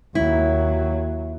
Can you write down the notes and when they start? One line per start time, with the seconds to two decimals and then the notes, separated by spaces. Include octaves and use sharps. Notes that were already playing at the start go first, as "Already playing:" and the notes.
0.15 D#2 F#3 E4